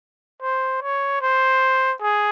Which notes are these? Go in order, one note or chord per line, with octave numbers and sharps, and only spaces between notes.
C5
C#5
C5
G#4